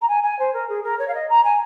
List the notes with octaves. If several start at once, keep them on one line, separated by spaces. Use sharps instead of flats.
A#5
G#5
G#5
C5
A#4
G#4
A#4
C#5
F5
D#5
A#5
G#5